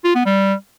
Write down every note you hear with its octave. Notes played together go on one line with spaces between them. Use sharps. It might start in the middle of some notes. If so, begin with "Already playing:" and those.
F4
B3
G3